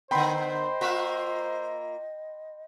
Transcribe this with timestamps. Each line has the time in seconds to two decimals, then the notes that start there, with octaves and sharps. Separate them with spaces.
0.11 D3 B3 C5 D#5 G5 B5 C6
0.81 A#3 F4 E5